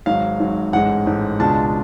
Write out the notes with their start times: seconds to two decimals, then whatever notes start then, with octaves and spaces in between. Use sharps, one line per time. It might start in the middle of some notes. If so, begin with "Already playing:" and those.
0.06 G#1 G#2 F#3 F5
0.40 G#1 G#2 F#3
0.73 A1 G#2 G#3 F#5
1.06 A1 G#2 G#3
1.40 C#2 B2 G#3 D4 F4 A5